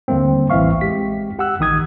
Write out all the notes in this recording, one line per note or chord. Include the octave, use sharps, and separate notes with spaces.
D#2 D3 G3 A3 A#3 C4
A1 E3 C4 E5 F5 C#6
G#3 G4 B6
G4 F#5 G5 E6 F#6
A#1 D#3 D#4 D#6 G#6